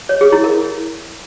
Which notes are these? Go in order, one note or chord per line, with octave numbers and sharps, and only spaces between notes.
C#5
G#4
E4
A#4